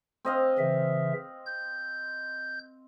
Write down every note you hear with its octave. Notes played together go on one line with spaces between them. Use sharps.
C4 D#5 F5
C#3 E3 E5
G6